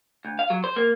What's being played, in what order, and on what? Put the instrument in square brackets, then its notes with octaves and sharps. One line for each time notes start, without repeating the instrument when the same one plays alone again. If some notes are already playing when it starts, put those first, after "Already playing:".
[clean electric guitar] D2
F5
F#3
C5
A#3